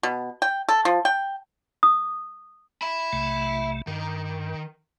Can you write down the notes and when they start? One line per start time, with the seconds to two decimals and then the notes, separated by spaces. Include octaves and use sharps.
0.03 B2
0.42 G5
0.69 A4
0.85 F3
1.05 G5
1.83 D#6
2.82 E5 B5
3.13 B1 C3 A3
3.87 G2 D#3